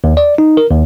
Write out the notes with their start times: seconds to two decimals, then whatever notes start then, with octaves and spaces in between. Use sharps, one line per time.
0.04 D#2
0.17 D5
0.38 D#4
0.57 A#4
0.71 D#2